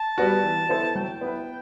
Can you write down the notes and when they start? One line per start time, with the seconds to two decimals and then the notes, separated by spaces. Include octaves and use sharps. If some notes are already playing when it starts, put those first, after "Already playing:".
Already playing: A5
0.18 G3 B3 F#4
0.43 E3
0.69 B3 E4 A4 C5
0.95 F#3 G5
1.21 B3 E4 B4